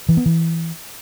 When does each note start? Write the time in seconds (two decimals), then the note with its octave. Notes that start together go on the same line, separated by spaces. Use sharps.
0.09 E3
0.17 B3
0.26 E3